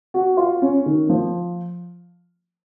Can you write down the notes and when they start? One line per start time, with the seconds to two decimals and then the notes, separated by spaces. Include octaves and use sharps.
0.14 F#4
0.37 F4
0.62 C#4
0.86 D#3
1.09 F3